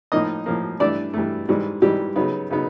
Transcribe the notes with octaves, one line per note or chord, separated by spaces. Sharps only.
A2 F3 A#3 D#4 D#5
A2 F3 A#3
G2 E3 A3 D4 D5
G2 E3 A3
G#2 E3 G3
G#2 E3 G3 G4
C#3 F#3 B3 D#4
C#3 F#3 B3 D#4